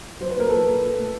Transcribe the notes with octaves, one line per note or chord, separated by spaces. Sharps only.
F#3 C5
B4
A#2 A#4
A#2 A4 B4
A#2
A#2
A3